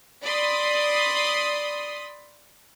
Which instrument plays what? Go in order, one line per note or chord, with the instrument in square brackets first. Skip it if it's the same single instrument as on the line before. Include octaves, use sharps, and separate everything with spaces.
[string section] D5 B5 C6 D#6